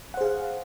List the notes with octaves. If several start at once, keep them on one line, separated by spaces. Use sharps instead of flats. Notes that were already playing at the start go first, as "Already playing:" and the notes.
G#4 C5 F5 F#5